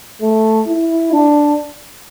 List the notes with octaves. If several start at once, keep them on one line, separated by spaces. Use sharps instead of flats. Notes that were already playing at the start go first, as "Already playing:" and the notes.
A3
E4
D4